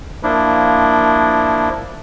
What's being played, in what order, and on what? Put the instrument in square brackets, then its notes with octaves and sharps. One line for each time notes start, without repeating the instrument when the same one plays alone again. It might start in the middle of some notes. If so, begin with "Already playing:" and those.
[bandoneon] F3 A#3 D4 E4